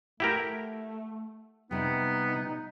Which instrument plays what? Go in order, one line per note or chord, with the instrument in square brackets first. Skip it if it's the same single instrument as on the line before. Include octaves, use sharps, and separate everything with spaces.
[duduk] A3 [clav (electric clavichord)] E4 G4 A#4 [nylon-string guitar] F#5
[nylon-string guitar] C3 G3 [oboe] B3 [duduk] D#4